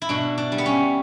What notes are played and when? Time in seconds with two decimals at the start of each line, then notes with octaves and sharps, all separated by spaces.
0.02 E4
0.09 B2 D4
0.38 D4
0.52 G3
0.58 B3
0.66 C#4